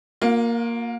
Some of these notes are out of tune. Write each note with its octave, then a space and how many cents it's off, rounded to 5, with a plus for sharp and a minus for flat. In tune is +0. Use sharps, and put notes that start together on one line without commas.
A#3 +0 F4 +40